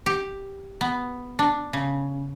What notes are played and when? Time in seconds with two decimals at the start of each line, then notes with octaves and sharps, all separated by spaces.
0.06 G4
0.81 B3
1.39 D4
1.73 C#3